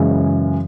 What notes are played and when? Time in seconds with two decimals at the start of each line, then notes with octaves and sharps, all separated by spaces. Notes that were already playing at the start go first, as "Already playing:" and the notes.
Already playing: F#2 C#3 E3 G#3